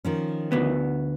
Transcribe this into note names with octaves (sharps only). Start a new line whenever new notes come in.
D#3 F3 C#4
D2 B3